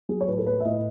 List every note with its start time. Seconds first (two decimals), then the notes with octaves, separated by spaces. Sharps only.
0.09 F#3 G#4
0.21 C#5
0.28 A2 B4
0.38 A4
0.46 A3 B4
0.60 E5
0.65 A2 D#5